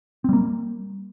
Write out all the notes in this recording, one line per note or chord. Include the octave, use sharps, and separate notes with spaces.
G3 A#3 C4